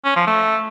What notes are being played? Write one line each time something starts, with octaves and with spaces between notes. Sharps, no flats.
C#4
F3
A3